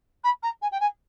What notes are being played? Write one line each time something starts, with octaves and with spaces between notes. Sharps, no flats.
B5
A#5
G#5
G5
G#5